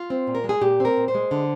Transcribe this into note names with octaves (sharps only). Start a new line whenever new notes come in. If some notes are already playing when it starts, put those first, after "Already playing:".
Already playing: F4
C4
A#2
A#4
G#3
G#4
A#2 G4
C4 A#4
A#2
C5
G#3
D3